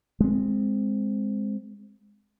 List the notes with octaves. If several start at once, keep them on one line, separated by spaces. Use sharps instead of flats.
G#3 C4